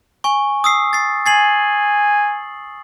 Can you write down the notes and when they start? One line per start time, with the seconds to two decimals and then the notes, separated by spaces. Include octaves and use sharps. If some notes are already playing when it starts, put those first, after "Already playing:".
0.24 G#5 C#6
0.64 D#6 E6 C7
0.93 A6 C7
1.26 G#5 A6 C7 F#7